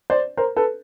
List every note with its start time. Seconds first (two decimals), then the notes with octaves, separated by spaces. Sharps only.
0.10 C5 D5
0.37 A#4 C5
0.56 A4 B4